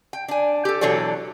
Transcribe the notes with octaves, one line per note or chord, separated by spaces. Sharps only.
G5
D4 G#5
G4 A4
B2 E3 F#3 D4 A4 C#5